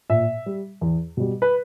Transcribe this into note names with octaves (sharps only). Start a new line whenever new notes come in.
A#2 E5
G3
E2
B2 G3
B4